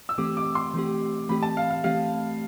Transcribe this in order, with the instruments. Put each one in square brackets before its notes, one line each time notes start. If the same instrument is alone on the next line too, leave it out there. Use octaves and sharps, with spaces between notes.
[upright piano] E6
[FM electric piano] E3 A3 C4 G4 [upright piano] D6
[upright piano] D6
C6
[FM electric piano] E3 A3 C4 G4
[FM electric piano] E3 A3 C4 G4 [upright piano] B5
[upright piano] A5
F5
F5
[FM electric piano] E3 A3 C4 G4 [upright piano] F5